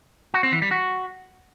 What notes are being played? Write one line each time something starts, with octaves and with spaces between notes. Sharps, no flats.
F#4
C4
E3
G3
F#4